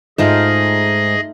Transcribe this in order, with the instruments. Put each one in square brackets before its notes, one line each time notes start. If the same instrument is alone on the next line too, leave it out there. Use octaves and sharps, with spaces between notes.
[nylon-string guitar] G#2 [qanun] A3 D#4 F4 [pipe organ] G#4 D#5